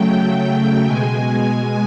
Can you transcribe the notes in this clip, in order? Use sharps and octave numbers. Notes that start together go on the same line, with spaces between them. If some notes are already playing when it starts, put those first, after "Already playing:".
Already playing: C#3 F#3 A3 G5
G5
B2 G#3 G#5